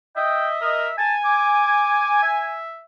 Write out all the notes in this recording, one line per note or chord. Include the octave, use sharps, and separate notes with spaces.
D#5 E5 G5
A#4
G#5 A5
D6
E5